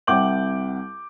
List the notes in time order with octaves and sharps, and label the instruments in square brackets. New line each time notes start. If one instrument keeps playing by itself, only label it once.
[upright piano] C2 F#5 G5 D6 G6 F#7